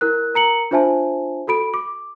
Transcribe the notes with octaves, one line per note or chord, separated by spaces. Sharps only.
E4 A#4 F#6
A#4 A#5 C#7 F#7
D4 F4 C5 E5 G#5 A5
F#4 A4 B5 D7
D6